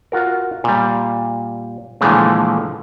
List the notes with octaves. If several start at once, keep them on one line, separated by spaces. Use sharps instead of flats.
F4 F#4 A#4
A#2 G3
A#2 D3 E3 F3 G#3 A3